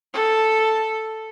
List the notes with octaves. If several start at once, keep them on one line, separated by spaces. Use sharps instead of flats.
A4